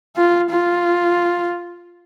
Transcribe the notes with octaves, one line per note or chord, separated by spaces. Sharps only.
F4
F4